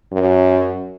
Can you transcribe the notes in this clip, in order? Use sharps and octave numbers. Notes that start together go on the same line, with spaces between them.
F#2